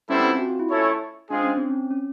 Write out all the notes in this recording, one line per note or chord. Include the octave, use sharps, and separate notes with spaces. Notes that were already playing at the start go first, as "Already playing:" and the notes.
G3 B3 C#4 E4 A4 C5
C4
F4
F#4
F4
E4
A3 C#4 E4 A4 C#5
G#3 C4 D4 F4 G#4
C#4
C4
C#4
C#4